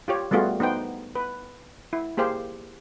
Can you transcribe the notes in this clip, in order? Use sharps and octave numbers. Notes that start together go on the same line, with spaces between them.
F4 G4 C#5
G3 A3 B3 F4 F#4 G#4
B3 D#4 C5 G5
B4
E4
A#3 G4 G#4 C5 F5